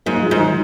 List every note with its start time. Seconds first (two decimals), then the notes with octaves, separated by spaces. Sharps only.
0.06 G#2 F#3 A#3
0.22 F3 G#3
0.31 G#2
0.39 D#3 F#3